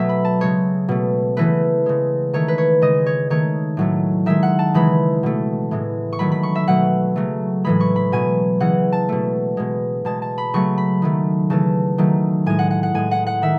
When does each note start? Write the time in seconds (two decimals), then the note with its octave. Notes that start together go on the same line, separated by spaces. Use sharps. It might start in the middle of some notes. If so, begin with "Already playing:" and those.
Already playing: B2 F#3 A3 E5
0.09 B5
0.25 A5
0.41 C#3 G#3 C#5
0.88 B2 A3
1.37 C#3 E3 A3 B4
1.86 C#3 G#3
2.33 D#3 A3 C#5
2.48 B4
2.58 C#5
2.82 C#3 G#3 D#5
3.06 C#5
3.30 D#3 A3 C#5
3.77 A2 F#3 A3
4.26 D#3 G#3 E5
4.43 F#5
4.59 A5
4.74 C#3 E3 G#3 B5
5.23 B2 A3
5.71 A2 E3 G#3
6.13 C#6
6.19 D#3 F#3 A3 B5
6.32 B5
6.43 C#6
6.55 E5
6.68 B2 F#3 A3 F#5
7.16 C#3 F#3 A3
7.64 A2 E3 G#3 B5
7.80 C#6
7.96 B5
8.12 B2 F#3 A3 G#5
8.60 C#3 E3 G#3 F#5
8.92 A5
9.09 B2 A3
9.57 B2 G#3
10.05 B2 G#3 A5
10.22 A5
10.38 B5
10.54 C#3 F#3 A3 C#6
10.78 B5
11.02 D#3 F#3 A3
11.50 C#3 E3 A3 A5
11.98 D#3 F#3 A3
12.46 A2 G#3 G#5
12.59 F#5
12.71 F#5
12.83 F#5
12.94 A2 G#3 G#5
13.11 F#5
13.27 F#5
13.42 D#3 E5